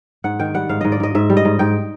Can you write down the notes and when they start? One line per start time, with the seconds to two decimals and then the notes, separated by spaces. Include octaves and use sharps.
0.24 G#2 F#5
0.39 D#3 G5
0.54 G3 F#5
0.69 G#2 F5
0.81 G#2 D#5
0.92 D5
1.00 G#2 D#5
1.15 G#2 E5
1.30 G3
1.37 D#5
1.45 G#2
1.59 G#2 G5